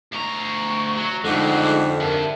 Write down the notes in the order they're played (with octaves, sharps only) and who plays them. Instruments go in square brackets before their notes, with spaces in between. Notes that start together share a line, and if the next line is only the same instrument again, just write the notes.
[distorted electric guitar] D2 A#5 [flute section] C#6
[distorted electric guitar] F#3
[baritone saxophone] F2 [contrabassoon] D3 [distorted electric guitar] G#3 A3 [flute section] D#4 F#5 D6
[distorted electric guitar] G2 [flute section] A#4 E5 A5